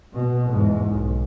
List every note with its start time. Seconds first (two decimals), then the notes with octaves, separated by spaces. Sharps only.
0.13 B2
0.50 E2 G#2
0.90 B1